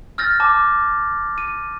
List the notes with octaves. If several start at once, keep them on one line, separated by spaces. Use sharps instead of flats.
E6 F6 G6 A6 A#6
A5 D6
D#7